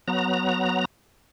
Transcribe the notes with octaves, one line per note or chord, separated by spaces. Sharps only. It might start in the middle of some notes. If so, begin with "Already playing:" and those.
F#3 B3 A#5